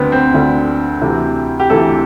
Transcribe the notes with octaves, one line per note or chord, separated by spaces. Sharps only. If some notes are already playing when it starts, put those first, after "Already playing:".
Already playing: D2 D3 B3 C4
C4
D2 D3
D2 C3 E3
G4
D2 C3 E3 A4